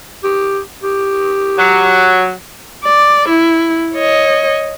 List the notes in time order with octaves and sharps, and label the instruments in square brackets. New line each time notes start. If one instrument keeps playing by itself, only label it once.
[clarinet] G4
G4
[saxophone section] F#3
[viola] D5
E4
C#5 D#5